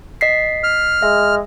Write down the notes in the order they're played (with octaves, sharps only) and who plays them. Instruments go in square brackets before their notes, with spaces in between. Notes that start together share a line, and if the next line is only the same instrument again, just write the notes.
[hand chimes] D#5 B6 C7
[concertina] F6
[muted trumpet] G#3 [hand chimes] E5